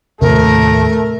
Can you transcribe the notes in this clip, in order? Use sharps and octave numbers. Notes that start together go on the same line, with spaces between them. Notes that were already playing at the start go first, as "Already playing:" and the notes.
D#2 A2 C3 F3 A3 A#4